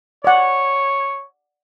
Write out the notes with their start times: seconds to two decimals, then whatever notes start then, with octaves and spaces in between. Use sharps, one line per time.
0.24 C#5 D5 F#5